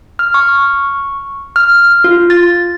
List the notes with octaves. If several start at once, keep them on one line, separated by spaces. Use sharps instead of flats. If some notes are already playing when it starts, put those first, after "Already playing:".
F6
C#6
F6
F4
A6